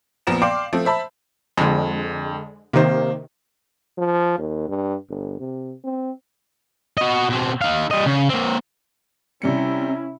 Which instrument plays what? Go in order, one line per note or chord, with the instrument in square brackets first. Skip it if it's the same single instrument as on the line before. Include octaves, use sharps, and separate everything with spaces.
[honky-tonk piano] A#1 A#2 F3 B3 A#5 E7
D5 F5 G5 C6 D6
F3 A3 C4
C5 E5 A5 B5
[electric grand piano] F2 [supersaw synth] D3 G#3
[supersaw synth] C3 D#3 [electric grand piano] A#3 C5
[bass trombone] F3
D#2
G2
G1
C3
C4
[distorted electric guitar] F#4 D#5
B2 C4
D#4 F5
G3 D#5
C#3
A#3 C4
[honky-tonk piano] C3 G3 C#7 [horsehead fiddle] C#4 E4